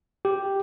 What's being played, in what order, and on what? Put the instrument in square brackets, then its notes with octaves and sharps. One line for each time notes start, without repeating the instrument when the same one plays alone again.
[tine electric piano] G4